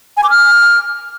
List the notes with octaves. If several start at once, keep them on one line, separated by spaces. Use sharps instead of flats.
G#5
D6
F6